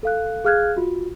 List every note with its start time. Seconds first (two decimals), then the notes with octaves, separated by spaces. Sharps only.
0.03 A4 F5 F#6
0.45 G#4 F5 F6 F#6 G#6
0.77 F4 F#4